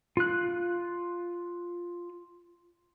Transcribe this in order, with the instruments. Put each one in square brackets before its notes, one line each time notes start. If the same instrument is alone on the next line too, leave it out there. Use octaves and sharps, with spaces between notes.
[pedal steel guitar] F4 F#6